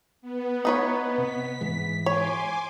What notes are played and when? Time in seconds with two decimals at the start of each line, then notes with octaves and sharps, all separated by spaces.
0.22 B3
0.65 D#4 B4 C#5
1.18 C3 B6
1.61 G#2 E3 G#3
2.06 C#5 G#5 C6 D6